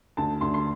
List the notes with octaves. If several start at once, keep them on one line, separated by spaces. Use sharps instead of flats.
D2 A5
D2 C6
C6